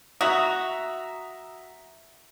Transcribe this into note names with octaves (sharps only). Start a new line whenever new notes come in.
F#4 E5 A#5 D#6